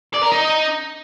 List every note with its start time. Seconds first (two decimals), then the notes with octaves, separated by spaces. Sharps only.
0.14 D5
0.23 A#4
0.32 D#4